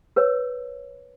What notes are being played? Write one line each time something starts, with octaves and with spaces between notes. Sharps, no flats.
A#4 B4 C#5